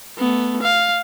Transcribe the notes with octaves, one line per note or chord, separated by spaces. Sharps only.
A3 B3
F5